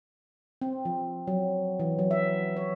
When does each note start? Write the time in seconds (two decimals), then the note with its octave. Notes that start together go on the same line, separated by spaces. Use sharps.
0.62 C4
0.85 F3
1.27 F#3
1.80 E3
1.99 F#3
2.11 E5
2.57 C#5